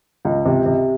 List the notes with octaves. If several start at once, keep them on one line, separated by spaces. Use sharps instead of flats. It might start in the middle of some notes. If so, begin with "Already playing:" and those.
C#2
C3
C3